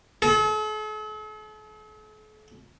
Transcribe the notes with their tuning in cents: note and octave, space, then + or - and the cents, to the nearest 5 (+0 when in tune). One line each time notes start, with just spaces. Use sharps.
A4 -45